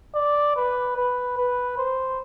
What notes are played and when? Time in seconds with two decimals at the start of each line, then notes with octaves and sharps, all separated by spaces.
0.15 D5
0.56 B4
0.97 B4
1.37 B4
1.78 C5